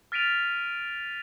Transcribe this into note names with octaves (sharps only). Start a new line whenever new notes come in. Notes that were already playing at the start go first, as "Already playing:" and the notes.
F6 A6 B6 D7 D#7 F7